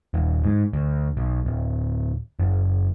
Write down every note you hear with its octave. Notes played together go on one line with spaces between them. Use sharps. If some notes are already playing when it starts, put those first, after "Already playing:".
D#1
G#2
D2
B1
D1
F#1